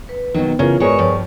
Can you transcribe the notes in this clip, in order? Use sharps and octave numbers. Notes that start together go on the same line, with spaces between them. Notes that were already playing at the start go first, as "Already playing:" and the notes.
B4
B2 D#3 F#3
C#3 E3 F4 A#4 C#5
G#2 B3 F#4 G#4 A#4 C#5 D5 C#6
G2 F3